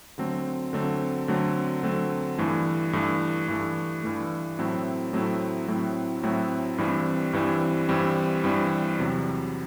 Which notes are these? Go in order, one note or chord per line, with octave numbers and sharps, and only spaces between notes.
D3 F#3 A3 C4
D3 F#3 A3 C4
D3 F#3 A3 C4
D3 F#3 A3 C4
G2 E3 A3
G2 E3 A3
G2 E3 A3
G2 E3 A3
A2 F#3 A3 C4 E4
A2 F#3 A3 C4 E4
A2 F#3 A3 C4 E4
A2 F#3 A3 C4 E4
G2 E3 G3 C4
G2 E3 G3 C4
G2 E3 G3 C4
G2 E3 G3 C4
E2 C3 F#3